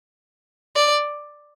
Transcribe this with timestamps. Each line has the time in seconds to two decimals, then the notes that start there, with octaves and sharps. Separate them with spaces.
0.75 D5